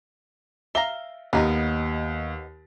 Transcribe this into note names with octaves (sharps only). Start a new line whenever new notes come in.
E5 F5 A#5 G7
D#2 B3 D#4 A#4